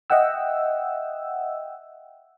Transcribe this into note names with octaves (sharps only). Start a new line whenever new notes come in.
D#5 E5 F#5 G5 E6